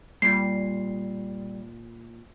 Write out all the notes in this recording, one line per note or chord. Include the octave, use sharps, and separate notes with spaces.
A#2 G3 C7